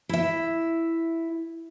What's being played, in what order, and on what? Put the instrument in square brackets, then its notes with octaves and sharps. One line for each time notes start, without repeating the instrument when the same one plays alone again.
[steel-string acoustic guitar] E4 E5